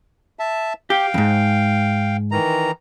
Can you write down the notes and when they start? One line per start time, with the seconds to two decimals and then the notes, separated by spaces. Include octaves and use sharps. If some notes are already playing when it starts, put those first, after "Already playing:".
0.39 E5 A5
0.90 G4 F5 G5
1.14 F2 G#2
2.31 D#3 E3 A#5